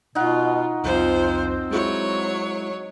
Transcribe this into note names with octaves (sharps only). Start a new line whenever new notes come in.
B2 D#4 F4 F#5
C2 F2 F3 C4 C5
F#3 G#3 E4 C#5